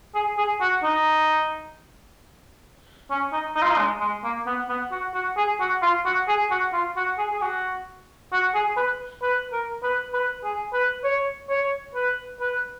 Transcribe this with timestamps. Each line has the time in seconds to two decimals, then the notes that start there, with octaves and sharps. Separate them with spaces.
0.15 G#4
0.38 G#4
0.61 F#4
0.83 D#4
3.10 C#4
3.33 D#4
3.55 D#4
3.62 F4
3.71 D#4
3.78 G#3
4.00 G#3
4.24 A#3
4.46 B3
4.69 B3
4.92 F#4
5.14 F#4
5.37 G#4
5.60 F#4
5.82 F4
6.05 F#4
6.28 G#4
6.51 F#4
6.73 F4
6.96 F#4
7.18 G#4
7.33 G#4
7.42 F#4
8.33 F#4
8.55 G#4
8.77 B4
9.22 B4
9.52 A#4
9.83 B4
10.14 B4
10.44 G#4
10.73 B4
11.04 C#5
11.50 C#5
11.95 B4
12.40 B4